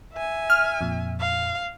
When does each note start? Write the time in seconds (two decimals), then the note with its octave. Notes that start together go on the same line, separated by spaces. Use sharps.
0.13 E5 G#5
0.50 F6
0.81 F2 A#2
1.19 F5